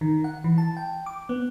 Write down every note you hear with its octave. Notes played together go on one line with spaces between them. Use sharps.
D#3
F#5
E3
A5
G5
D6
B3